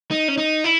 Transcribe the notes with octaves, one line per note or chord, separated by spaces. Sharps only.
D#4
C#4
D#4
E4